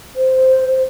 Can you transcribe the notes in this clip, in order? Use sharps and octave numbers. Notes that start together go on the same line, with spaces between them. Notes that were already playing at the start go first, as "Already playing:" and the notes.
C5